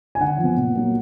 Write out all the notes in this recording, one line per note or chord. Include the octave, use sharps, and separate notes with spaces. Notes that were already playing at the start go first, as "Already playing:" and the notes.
G#5
D3 F#5
F3
B3
A#2
F#3 A#3